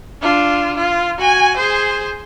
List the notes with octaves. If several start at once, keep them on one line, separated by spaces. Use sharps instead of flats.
D4 F4
F4
F#4 G#5
G#4 C5